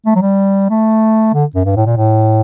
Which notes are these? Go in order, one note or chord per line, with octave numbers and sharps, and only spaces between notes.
A3
F#3
G3
A3
D3
F#2
G2
A2
A#2
A2